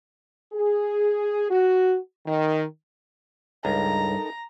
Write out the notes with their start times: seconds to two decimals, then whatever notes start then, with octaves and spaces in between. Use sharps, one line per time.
0.53 G#4
1.49 F#4
2.25 D#3
3.65 C#2 G2 D#4 A4 A#4 A#5